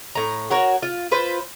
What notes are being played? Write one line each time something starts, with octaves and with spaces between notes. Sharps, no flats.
A2 A#5
F#4 A#4 C#5 F#5
F4
F4 B4 C5